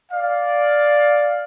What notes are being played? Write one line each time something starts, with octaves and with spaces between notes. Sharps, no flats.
D5 F5